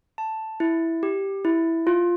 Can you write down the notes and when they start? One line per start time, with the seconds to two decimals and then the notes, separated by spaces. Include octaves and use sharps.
0.18 A5
0.60 E4
1.03 G4
1.45 E4
1.87 F4